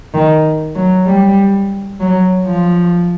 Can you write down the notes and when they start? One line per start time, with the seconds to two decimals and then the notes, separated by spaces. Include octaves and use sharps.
0.14 D#3
0.76 F#3
1.07 G3
2.00 F#3
2.46 F3